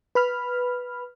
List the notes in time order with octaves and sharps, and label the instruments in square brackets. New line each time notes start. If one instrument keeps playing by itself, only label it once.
[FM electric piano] B4 B5 F6